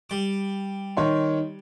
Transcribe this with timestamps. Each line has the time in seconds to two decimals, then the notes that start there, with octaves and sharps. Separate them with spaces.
0.10 G3 D6
0.97 D#3 C#5 C6